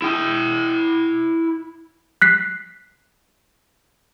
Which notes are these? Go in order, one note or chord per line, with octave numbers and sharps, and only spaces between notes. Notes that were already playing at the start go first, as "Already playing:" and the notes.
E4 G5
F#6 B6 C7